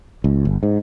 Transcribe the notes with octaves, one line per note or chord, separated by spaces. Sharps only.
C#2
G1
G#2